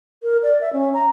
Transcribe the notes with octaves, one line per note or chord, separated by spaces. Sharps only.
A#4
D5
E5
C#4
A#5